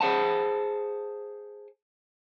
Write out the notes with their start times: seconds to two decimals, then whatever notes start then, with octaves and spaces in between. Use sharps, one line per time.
0.01 G#4 C5 F#5 A5